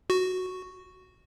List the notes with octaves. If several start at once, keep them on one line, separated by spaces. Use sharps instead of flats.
F#4